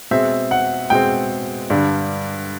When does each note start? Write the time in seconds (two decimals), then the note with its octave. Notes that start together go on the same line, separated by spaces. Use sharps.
0.11 B2 G#3 C4 E5
0.51 F#5
0.90 B2 G#3 C4 G5
1.70 G2 D3 G3